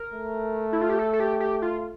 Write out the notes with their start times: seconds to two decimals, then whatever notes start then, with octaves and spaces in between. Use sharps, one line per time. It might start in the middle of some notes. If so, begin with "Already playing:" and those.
Already playing: A#4
0.14 A3
0.73 E4
0.81 F4
0.89 G4
0.99 A4
1.13 A4
1.20 G4
1.40 G4
1.62 F4